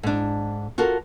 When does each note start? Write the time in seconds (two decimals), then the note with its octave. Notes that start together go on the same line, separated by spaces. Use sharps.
0.03 G#2 D4
0.78 F4 F#4 A4 A#4